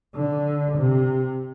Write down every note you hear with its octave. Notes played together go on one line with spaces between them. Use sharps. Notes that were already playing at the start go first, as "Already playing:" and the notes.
D3
C3